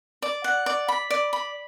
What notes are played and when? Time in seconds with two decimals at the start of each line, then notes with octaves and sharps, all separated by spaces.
0.22 D5
0.44 F#5
0.66 D5
0.88 B5
1.10 D5
1.33 B5